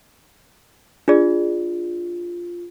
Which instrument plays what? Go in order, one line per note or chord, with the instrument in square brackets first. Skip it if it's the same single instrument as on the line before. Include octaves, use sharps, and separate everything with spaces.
[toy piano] D4 G#4 D5 [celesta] F4